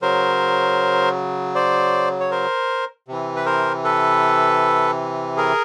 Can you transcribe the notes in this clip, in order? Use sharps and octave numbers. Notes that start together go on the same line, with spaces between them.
C#3 F#3 A#4 C5
C5 D5
C#5
A#4 C5
C3 E3
B4
A#4 C5
A4 B4
G#4 A#4